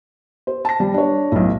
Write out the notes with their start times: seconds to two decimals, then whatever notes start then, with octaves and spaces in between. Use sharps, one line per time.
0.47 C5
0.65 A5 A#6
0.80 G3
0.94 D4 C#5
1.32 B1 A2